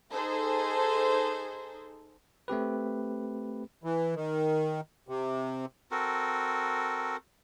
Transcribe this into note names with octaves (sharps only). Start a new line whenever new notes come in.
D#4 G#4 A4 C5
A3 C4 G4 B4
E3
D#3
C3
C4 F#4 A4 A#4